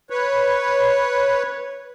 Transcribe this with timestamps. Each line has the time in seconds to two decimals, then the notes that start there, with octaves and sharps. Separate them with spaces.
0.10 B4 C#5